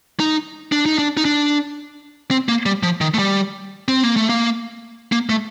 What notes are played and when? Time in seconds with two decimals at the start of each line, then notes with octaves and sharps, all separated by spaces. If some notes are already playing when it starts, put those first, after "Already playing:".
0.20 D#4
0.72 D4
0.86 D#4
0.98 D4
1.17 D#4
1.25 D4
2.31 C4
2.49 A#3
2.66 G3
2.83 F3
3.01 D#3
3.14 A3
3.19 G3
3.88 C4
4.03 A#3
4.16 A3
4.29 A#3
5.12 A#3
5.29 A3